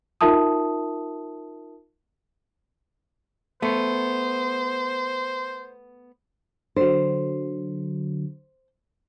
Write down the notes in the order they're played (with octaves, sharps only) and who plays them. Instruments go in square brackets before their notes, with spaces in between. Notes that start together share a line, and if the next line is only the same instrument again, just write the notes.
[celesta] D#4 F4 A#4 E5 A5 D#6
[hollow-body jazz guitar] A3 B3 [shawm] C5
[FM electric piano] D3 F#3 [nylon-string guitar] C5